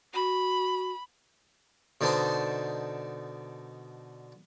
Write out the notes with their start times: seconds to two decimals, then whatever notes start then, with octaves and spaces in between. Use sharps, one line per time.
0.14 F#4 B5
2.01 B2 D3 D#4 C5 A5 C6